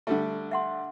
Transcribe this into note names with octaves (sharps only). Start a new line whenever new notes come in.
D3 G3 A3 E5
E5 F#5 C6